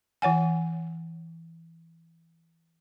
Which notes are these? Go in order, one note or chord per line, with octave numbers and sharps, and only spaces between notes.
E3 C#5 F#5 G#5